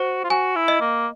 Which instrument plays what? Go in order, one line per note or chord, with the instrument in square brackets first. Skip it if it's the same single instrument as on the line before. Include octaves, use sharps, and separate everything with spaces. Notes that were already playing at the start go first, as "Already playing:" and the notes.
Already playing: [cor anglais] F#4 [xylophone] C5
[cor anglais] F4
[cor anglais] F#4 [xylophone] G#5
[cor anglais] E4
[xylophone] D#5
[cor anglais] A#3